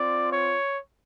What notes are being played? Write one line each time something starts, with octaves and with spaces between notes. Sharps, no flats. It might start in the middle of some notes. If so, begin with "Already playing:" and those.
Already playing: C4 F4 D5
C#5